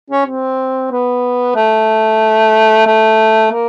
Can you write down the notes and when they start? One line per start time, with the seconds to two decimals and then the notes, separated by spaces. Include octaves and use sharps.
0.10 C#4
0.26 C4
0.91 B3
1.56 A3
2.87 A3
3.51 A#3